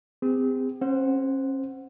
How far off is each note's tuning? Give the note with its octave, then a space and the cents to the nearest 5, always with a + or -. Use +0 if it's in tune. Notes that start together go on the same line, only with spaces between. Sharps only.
C4 -35 G#4 -45
C#4 -40 C5 -5 F#5 +0